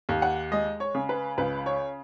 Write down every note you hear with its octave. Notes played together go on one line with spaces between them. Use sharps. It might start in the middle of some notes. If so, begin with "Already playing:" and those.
D#2
F#5
G#3 D#5
C#5
C#3
B4
C#2 B4
C#5